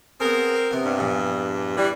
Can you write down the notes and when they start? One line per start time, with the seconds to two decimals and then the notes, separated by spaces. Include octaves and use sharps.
0.20 B3 C4 G#4 A#4
0.71 C3 B3
0.83 G2
0.98 A#1 E2 A#2
1.77 E3 G3